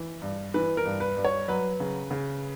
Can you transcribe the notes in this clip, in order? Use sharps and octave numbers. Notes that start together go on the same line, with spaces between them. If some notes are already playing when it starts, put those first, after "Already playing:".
Already playing: E3
G2
E3 B4
A#4
G2
B4
G2
C#5
F#3 B4
C#3
C#3